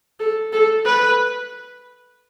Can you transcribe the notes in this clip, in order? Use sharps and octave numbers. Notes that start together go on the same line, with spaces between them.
A4
A4
B4